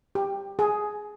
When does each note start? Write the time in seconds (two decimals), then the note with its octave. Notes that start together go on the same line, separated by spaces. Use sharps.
0.15 G4
0.59 G#4